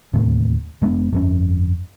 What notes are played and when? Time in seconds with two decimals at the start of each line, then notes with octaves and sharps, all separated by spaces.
0.13 D1 D#2 A2 C3
0.82 F1 G#3 B3 D4
1.12 G1 F2 C#4